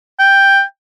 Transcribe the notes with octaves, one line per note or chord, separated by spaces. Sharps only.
G5